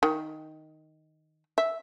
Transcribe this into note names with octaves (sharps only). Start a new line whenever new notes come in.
D#3
E5